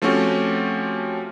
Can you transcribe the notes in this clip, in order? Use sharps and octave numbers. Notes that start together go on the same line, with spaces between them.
F3 A3 C4 C#4 F#4 G4